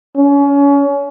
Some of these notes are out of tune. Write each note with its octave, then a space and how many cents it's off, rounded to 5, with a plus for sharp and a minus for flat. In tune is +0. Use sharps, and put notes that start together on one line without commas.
C#4 +30